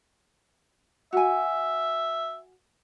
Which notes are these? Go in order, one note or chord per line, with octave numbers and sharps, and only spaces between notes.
F#4 E5 G#5